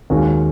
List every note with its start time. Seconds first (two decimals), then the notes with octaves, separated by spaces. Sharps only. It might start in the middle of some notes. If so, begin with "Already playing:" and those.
0.10 D#2 D#3 G#3 C#4 F#4